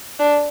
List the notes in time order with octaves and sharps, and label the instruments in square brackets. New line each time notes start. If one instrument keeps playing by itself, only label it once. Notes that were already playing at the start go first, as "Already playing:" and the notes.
[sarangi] D4